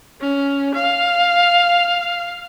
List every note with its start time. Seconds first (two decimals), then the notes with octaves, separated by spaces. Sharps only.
0.21 C#4
0.74 F5